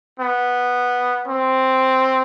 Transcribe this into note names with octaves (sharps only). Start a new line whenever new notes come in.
B3
C4